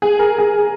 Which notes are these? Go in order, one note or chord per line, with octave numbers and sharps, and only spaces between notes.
G#4
A#4
G#4